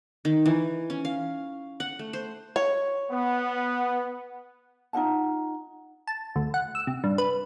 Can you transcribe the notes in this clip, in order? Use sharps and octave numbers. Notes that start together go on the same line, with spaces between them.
D#3
E3
C#4
F5
F#5
A3
C5
C#5
B3
D#4 F4 F#5 A5
A5
D2
F#5
E6
C3
G2
B4